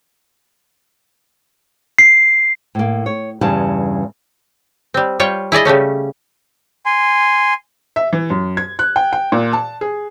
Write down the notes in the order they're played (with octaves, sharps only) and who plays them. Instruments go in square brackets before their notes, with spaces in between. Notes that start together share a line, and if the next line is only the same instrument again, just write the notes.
[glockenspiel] C7
[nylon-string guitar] A2 A#3
C#5
E2 G2 C#3 G3 A5
[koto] G3 C4
G3 F4 C#5 G5
E4 G#4 D5 D#5
C#3 G3 A3 C#4
[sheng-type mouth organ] G#5 C6
[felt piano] E5
E3
F#2
G#6
F#6
G5
G5
A#2
A5
G#4